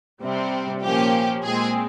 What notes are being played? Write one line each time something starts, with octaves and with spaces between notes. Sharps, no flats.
C3 G3 C4
A#2 F3 A#3 C#4 G4
A#2 G#3 C4 G#4